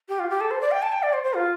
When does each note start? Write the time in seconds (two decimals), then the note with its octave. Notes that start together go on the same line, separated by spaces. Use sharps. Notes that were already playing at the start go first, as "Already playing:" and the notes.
0.08 G4
0.19 F4
0.30 G4
0.40 A4
0.51 C5
0.61 D5
0.71 G5
0.82 A5
0.92 G5
1.03 D5
1.13 C5
1.24 C5
1.34 F4